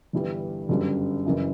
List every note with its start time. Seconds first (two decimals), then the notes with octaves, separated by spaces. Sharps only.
0.13 G1 G2 E3 G3
0.69 G1 F#2 C#3 G3
1.26 F#1 F#2 E3